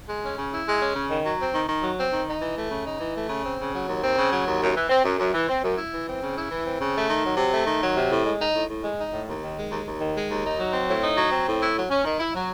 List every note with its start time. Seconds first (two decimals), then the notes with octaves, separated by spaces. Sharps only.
0.09 G#3
0.23 C#4
0.37 C#3
0.51 E4
0.67 G#3
0.80 C#4
0.95 C#3
1.10 D#3
1.25 F#3
1.39 C4
1.53 D#3
1.68 D#3
1.82 F#3
1.98 C4
2.12 D#3
2.27 D#4
2.41 E3
2.57 A3
2.70 C#3
2.85 D#4
2.99 E3
3.15 A3
3.28 C#3
3.43 C4
3.59 C#3
3.73 F#3
3.87 D#2
4.02 C4
4.16 C#3
4.31 F#3
4.46 D#2
4.61 F#2
4.75 E3
4.89 C4
5.04 F#2
5.19 F#2
5.33 E3
5.48 C4
5.63 F#2
5.77 E4
5.91 E3
6.07 C4
6.21 C#3
6.36 E4
6.51 E3
6.65 C4
6.80 C#3
6.94 A3
7.09 D#3
7.24 F#3
7.37 C3
7.52 A3
7.66 D#3
7.81 F#3
7.96 C3
8.11 A2
8.24 G#3
8.40 D#4
8.54 A2
8.69 A2
8.83 G#3
8.98 D#4
9.12 A2
9.27 D#2
9.42 D#3
9.56 G#3
9.71 D#2
9.85 D#2
10.01 D#3
10.15 G#3
10.30 D#2
10.44 D#4
10.59 F#3
10.73 C4
10.88 A2
11.02 D#4
11.17 F#3
11.32 C4
11.47 A2
11.60 E4
11.75 F#3
11.90 C#4
12.04 D#3
12.19 E4
12.34 F#3